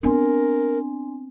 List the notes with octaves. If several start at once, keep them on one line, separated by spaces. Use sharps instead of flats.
B3 C4 D4 A#4 G#5 C6